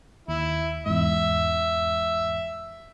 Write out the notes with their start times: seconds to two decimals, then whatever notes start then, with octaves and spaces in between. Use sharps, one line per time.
0.28 D#2 E4
0.86 E2 G#2 E5